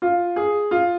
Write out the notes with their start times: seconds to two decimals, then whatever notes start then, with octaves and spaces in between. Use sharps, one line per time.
0.02 F4
0.36 G#4
0.71 F4